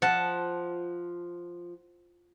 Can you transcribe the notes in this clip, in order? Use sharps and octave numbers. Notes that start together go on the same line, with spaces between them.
F3 F#5 A5